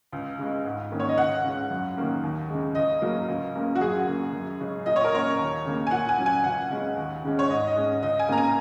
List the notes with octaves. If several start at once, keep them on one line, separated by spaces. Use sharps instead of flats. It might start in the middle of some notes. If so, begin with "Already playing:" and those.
C#2
C#3 G#3
G#2
D#3 A#3 C#4
C#5
D#5
C#2 F#5
C#3 G#3 C#4
F#2
D#3 A#3 C#4
D#2
C#3 G#3
C#2 D#5
C#3 F#3 A#3 C#4
C#2
C#3 A#3 C#4
F#4
F#2 G#4
C#3 A#3
F#2
C#3 G#3 C#4
A#2 D#5
C#5
A#4
A#3 C#4 C#5
D#2
C#3 A#3
G#5
A#2 F#5
G#5
F#3 C#4
G#5
C#2 F#5
C#3 G#3 C#4
D#2
C#3 G#3 C#4
C#5
G#2 D#5
D#5
G#3 C#4
C#2 D#5
G#5
C#3 A#3 C#4 A#5
G#5